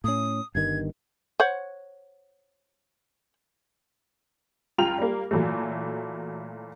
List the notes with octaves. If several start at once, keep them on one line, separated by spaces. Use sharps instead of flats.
A2 C#4 D#6
G1 G2 D#3 G#6
C5 C#5 F#5
C#2 F4 G5 A#5 F7
G3 A#3
A#2 E3 F#3 A3